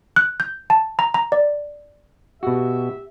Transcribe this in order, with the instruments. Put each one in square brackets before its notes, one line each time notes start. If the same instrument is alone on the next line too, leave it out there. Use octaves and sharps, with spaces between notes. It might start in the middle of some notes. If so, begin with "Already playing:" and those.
[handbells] F#6
G6
A5
A#5
A#5
D5
[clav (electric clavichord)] B2 F#4 [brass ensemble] G4 E5